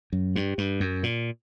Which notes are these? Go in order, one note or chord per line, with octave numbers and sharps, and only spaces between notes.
F#2
G2
G2
F#2
A#2